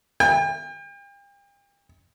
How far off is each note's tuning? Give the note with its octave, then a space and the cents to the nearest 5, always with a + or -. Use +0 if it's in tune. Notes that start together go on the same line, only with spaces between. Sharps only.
G5 +40